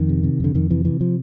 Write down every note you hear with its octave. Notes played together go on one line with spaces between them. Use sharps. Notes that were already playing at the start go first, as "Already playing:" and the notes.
Already playing: F2 D#3
C3
C3
F2 D3
F2 D#3
C3 E3
C3 E3
F3